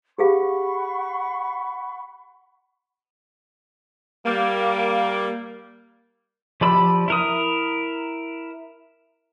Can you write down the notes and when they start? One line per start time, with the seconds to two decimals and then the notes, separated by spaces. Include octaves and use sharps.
0.18 G4 G#4 F5 F#5 B5 C#6
4.26 G3 A#3
6.61 F3 G4 D5 B5 E6
7.08 E4 A#4 D#6